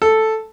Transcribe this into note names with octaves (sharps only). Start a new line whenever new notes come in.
A4